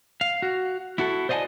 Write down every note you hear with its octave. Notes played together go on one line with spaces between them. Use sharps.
F5
F#4
E4 F#4 A4
C5 D5 D#5 F5 G#5 A5